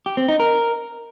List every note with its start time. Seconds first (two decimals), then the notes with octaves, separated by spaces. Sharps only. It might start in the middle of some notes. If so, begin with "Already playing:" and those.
0.06 G4
0.17 C4
0.28 D#4
0.40 A#4